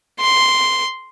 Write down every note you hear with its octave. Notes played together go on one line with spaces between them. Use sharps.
C6